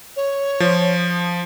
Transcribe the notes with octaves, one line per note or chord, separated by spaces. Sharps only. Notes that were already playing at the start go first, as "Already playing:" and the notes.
C#5
F3